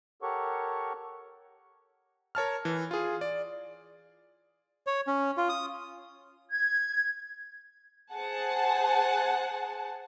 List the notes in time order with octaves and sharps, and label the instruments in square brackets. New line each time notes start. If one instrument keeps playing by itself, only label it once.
[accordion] G4 A4 A#4 C#5 F#5 C#6
[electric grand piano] A#4 C#5 A5 F6
E3
F4 G#4
D5
[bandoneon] C#5
C#4
F4
D#6
[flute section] G#6
[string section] G#4 C5 F#5 G#5 A5